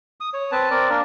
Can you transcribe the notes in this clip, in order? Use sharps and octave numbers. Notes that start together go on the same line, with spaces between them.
D#6
C#5
C4 B4 A5
C4 A#4 D5
A#3 D4 A#4